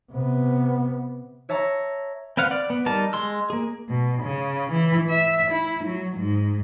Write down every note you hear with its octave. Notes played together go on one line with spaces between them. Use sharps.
C3 B3
C#5 E5 A5 A#5 C#6
C4 B4 F5 F#5
D5
B3
G3 D#4 A#4 A5 D6
G#3 C6 E6
A#3 G#4
B2
C#3
E3
E5
E4
F#3
G#2